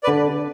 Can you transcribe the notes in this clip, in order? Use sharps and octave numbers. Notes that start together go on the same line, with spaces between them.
B4 D5
D3